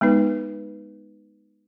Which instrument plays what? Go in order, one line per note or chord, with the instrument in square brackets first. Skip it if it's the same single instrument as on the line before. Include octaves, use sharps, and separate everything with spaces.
[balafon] G#3 B3 D#4 B4